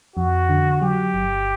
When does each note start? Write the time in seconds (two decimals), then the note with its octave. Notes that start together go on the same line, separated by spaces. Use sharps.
0.16 F2 F#4
0.49 D3
0.82 F#3 G4
1.14 G1